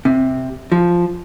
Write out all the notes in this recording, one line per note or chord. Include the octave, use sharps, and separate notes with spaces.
C3
F3